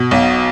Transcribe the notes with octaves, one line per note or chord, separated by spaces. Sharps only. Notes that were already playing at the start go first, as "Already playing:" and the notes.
Already playing: B2
B1